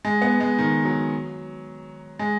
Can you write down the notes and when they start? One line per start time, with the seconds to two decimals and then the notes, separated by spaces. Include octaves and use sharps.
0.05 G#3
0.22 B3
0.40 G#3
0.58 D#3
0.85 F#3
2.19 G#3